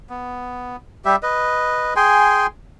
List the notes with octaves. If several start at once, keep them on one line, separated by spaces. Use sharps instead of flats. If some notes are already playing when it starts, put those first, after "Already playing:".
B3
G3 G4 E5
B4 D#5
G#4 G5 G#5 C6